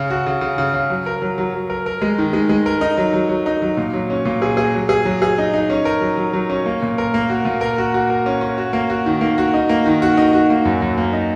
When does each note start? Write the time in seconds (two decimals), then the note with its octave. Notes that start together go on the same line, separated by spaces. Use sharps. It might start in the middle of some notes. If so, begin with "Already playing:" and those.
Already playing: C#3
0.10 F#4
0.26 C#3
0.41 C#3
0.58 C#3
0.74 C#3
0.90 F#3
1.06 A#4
1.22 F#3
1.38 F#3
1.54 F#3
1.70 A#4
1.86 A#4
2.02 G#3
2.18 D#3
2.33 G#3
2.49 G#3
2.66 A#4
2.81 D#4
2.98 F#3
3.14 F#3
3.29 F#3
3.46 D#4
3.62 F#3
3.77 A#2
3.94 F#3
4.10 C#4
4.25 A#2
4.42 G#4
4.57 G#4
4.74 F#3
4.89 G#4
5.05 F#3
5.22 G#4
5.38 D#4
5.53 D#4
5.70 C#4
5.85 A#4
6.01 F#3
6.17 F#3
6.33 F#3
6.50 C#4
6.66 A#3
6.82 A#2
6.98 A#4
7.14 A#3
7.29 F#4
7.45 A#2
7.61 A#4
7.78 F#4
7.94 F#4
8.10 A#4
8.26 C#4
8.41 C#4
8.58 F#4
8.73 A#3
8.90 F#4
9.06 D#3
9.21 A#3
9.38 F#4
9.54 D#4
9.69 A#3
9.86 D#3
10.02 F#4
10.17 D#4
10.33 F#4
10.50 A#3
10.65 F#2
10.82 F#2
10.98 A#3
11.13 D#4